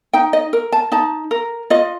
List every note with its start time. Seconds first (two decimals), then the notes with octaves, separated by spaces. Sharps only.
0.13 D#4 G5
0.33 D#5
0.53 A#4
0.72 A5
0.92 D#4 A5
1.31 A#4
1.70 F4 D#5